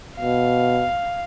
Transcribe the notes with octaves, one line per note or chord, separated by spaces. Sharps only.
B2 F5